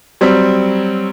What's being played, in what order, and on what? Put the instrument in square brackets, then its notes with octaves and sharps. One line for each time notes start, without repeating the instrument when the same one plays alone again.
[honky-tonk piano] F#3 G3 C4